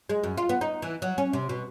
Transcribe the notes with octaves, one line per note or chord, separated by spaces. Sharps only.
G#3
F#2
F4
B3
D#4
E3
F#3
C#4
C3
B2